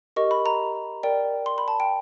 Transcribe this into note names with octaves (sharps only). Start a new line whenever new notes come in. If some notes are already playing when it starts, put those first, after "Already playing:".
G4 A#4 D#5 C#6
B5
A#5
A#4 D5 G5
C6
B5
A5
G5